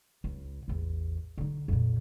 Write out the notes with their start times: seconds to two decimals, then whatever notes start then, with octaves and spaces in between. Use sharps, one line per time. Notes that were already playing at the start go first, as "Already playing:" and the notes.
0.24 C#2
0.68 A1 E2
1.38 D3 D#4
1.68 F2 A#2